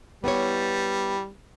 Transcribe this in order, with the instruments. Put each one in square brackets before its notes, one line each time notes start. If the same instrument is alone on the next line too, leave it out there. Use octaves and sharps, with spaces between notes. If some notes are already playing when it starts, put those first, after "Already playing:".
[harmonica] G3 [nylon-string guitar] B3 E4 C#5